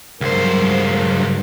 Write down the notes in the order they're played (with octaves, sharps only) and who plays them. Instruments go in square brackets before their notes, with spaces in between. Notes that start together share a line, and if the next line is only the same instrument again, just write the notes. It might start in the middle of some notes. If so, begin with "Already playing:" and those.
[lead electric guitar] C#2 C5 [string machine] G2 F#3 [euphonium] A#4